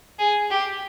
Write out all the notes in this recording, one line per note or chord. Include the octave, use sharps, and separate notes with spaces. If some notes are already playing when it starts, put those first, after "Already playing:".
G#4
G4